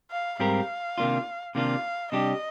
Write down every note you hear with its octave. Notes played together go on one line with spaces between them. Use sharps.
F5
G#2 G3 C4 G4 A#4 F5
C3 D#3 A#3 D4 F4
C3 D#3 A#3 D4 F4 F5
C3 G3 D4 G4 D#5